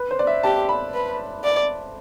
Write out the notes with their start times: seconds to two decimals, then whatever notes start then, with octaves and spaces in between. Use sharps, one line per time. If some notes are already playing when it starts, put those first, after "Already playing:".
Already playing: B4
0.11 C5
0.19 D5
0.27 E5
0.43 G4 A5
0.69 B5
0.94 B4
1.44 D5